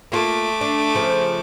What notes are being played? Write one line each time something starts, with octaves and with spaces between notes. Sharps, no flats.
A3 A#3 F4 D6
D4
C#3 F3